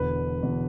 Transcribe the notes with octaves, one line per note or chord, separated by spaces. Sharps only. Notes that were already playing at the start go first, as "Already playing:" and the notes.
Already playing: E1 E2 D3 B4
E1 E2 D3